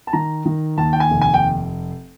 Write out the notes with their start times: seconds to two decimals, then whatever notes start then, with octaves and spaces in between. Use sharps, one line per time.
0.07 A5
0.13 D#3 A#5
0.45 D#3
0.77 D#2 A5
0.93 G5
1.00 G#5
1.11 F1
1.22 G#5
1.34 G5